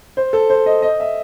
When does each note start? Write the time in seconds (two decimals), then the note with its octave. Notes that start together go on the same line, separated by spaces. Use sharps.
0.17 C5
0.33 A4
0.50 C5
0.66 D#5
0.82 D#5
1.00 E5